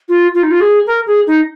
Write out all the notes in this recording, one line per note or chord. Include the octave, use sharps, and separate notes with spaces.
F4
F4
D#4
F4
G#4
A#4
G#4
D#4